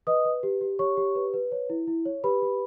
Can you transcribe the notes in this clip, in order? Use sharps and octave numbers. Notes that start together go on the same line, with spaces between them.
B4 D#5 D#6
B4
G4
G4
G4 C#5 C#6
G4
B4
B4
C#5
E4
E4
C#5
G4 B4 B5
G4